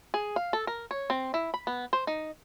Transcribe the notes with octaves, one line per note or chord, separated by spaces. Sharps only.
G#4
F5
A4
A#4
C#5
C4
E4
B5
B3
C5
D#4